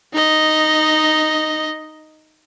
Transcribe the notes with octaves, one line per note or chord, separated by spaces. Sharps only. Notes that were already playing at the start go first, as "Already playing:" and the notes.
D#4 D#5